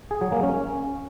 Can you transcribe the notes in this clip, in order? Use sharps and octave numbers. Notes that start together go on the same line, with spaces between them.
G#4
F#3
A#3
C#4